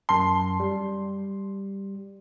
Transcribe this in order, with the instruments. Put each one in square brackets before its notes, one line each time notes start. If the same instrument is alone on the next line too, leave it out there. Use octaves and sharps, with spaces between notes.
[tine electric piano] F#2 C7 [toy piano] A5 [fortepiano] C6
[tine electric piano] G3